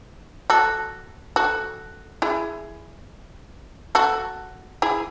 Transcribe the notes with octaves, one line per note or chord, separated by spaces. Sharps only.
F#4 A4
F#4 A4
E4 G#4
F#4 A4
E4 G#4